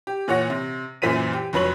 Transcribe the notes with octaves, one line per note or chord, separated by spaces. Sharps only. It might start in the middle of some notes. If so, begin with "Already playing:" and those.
G4
A#2 E3 C#5 F#5 A#6
C3
F#2 A#2 E3 C5 B6 D#7
G4
F1 F2 F#3 B4 C#5 F#7